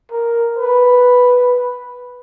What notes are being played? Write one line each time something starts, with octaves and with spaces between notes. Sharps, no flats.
A#4
B4